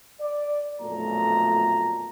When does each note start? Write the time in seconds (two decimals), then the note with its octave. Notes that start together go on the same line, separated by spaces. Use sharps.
0.21 D5
0.82 B1 F2 A#2 A3 A#5